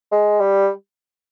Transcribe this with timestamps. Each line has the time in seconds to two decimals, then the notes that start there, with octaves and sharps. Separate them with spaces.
0.12 G#3
0.40 G3